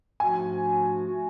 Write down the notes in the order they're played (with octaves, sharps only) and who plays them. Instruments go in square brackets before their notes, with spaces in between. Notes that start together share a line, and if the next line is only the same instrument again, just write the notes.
[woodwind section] G#2 F3 A3 D4 F#4 [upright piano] G#5
[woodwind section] F3 A3 D4 F#4